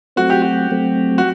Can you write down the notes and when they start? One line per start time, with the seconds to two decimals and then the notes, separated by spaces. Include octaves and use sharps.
0.16 F#3 A3 C4 F#4
0.30 G4
0.42 F#4
0.71 F#3 A3 C4
1.18 F#4